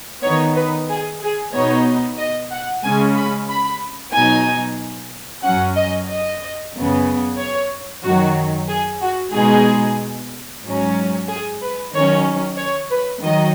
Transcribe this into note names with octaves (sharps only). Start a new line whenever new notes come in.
D#3 B3 D#4 C#5
B4
G#4
G#4
B2 B3 D#4 C#5
D#5
F#5
C#3 G#3 C#4 G#5
B5
B5
B2 F#3 D#4 G#5
F#2 F#3 C#4 F#5
D#5
D#5
F#2 C#3 B3
C#5
F#2 D#3 F#3 F#4
G#4
F#4
B2 G#3 D#4 G#4
G#2 F#3 C#4
G#4
B4
D#3 F#3 C#4 C#5
C#5
B4
D#3 F#3 D#5